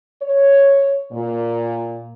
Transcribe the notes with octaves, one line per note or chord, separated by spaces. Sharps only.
C#5
A#2